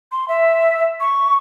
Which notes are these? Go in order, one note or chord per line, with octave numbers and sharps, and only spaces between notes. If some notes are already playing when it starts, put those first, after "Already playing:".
C6
E5
C#6